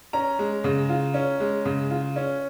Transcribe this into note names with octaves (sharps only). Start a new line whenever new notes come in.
C#4 A#5
G#3
C#3
F4
C#4
G#3
C#3
F4
C#4